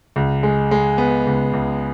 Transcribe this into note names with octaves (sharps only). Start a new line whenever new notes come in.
C#2
G#3
G#3
B3
C#2
C#2